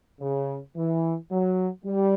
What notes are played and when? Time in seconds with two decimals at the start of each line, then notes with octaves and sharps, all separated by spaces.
0.21 C#3
0.77 E3
1.31 F#3
1.85 G3